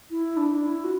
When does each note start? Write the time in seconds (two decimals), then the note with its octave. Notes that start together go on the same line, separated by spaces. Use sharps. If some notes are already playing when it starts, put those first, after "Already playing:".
0.11 E4
0.37 D4
0.64 E4
0.84 F#4